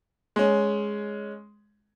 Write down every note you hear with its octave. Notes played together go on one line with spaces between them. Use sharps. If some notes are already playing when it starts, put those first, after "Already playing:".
G#3 C#4